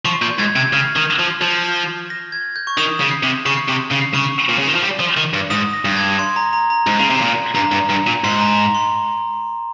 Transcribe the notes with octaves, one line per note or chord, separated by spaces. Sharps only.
F3 C#6
A#2 G6
G#2 G#6
C3 G#6
C#3 F6
D#3
F3
F3 G6
A#6
G#6
G6
C#6
D#3 D#6
C#3
C3
C#3 C#6
C3
C#3
C#3 C#6
A#2
C#3
D#3
F3
G3
F3
D#3
G2
G#2 D#6
A#6
G2
G#6
C6
A#5
A#5
A#5
G#2
C#3
C3
A#2
G2 A#5
G2
G2
A#2
G#2 C6
A#5
A#5
C6